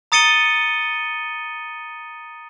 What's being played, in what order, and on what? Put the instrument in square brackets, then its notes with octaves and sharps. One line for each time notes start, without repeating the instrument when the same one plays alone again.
[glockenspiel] A#5 D#6 A6 C#7 D#7 G7